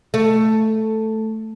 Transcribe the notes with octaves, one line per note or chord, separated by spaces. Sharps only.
A3